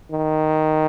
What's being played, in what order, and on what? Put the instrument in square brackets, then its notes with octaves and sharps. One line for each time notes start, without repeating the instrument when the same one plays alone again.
[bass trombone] D#3